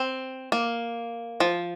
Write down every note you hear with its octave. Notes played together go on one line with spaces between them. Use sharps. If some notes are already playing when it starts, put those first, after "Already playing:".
Already playing: C4
A#3
F3